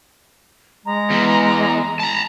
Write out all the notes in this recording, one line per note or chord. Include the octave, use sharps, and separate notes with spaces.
G#3 A#5
E2 E3
A5 A#5